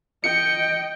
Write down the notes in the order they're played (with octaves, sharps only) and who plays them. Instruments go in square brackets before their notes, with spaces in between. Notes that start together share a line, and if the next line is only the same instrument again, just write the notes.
[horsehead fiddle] D#5 G5 [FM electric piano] C#7